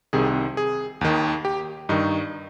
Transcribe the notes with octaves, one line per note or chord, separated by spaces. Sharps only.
C2 C3 D#3 G#4
G#4
D#2 D#3
G4
G2 D#3 D#4